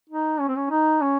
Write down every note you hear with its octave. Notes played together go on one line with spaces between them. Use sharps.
D#4
C#4
C4
C#4
D#4
C#4